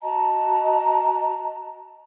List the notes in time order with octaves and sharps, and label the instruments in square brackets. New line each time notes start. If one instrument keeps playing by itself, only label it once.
[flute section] F#4 D#5 A5 A#5